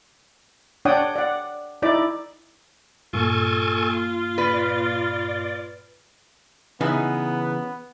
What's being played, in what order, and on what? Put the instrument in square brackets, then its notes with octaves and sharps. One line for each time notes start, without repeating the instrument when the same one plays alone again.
[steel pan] D4 C#5 D5 F#5 G5 D#6
D5 F#5
D#4 E4 D5 D6
[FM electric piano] G2 A#2 A#3 [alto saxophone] F4 [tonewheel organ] A4 G#5 C#6
[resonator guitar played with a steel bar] B4 [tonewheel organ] D5
[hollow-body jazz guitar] C#3 E3 D#4 [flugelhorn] B3